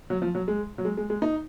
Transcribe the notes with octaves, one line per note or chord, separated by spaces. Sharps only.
F#3
F3
F#3
G#3
F#3
G#3
G#3
G#3
D#4